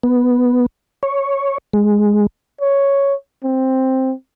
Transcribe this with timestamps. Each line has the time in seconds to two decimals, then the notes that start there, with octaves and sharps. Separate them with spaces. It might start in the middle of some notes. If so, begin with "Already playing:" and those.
0.03 B3
1.03 C#5
1.73 G#3
2.61 C#5
3.44 C4